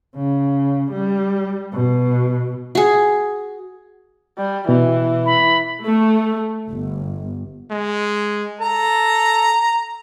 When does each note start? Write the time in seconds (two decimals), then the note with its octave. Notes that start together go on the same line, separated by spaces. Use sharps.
0.16 C#3
0.92 G3
1.73 B2
2.75 F#4 G#4
4.38 G3
4.69 B2 E3
5.26 B5
5.83 A3
6.68 G1
7.71 G#3
8.61 A4 A#5